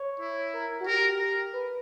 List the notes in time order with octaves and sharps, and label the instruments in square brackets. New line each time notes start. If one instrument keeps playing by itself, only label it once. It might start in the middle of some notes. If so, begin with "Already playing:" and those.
Already playing: [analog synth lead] C#5
[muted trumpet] E4
[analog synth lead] A#4
F#4
[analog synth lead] G4 [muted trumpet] A#4
[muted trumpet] A#4
[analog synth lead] B4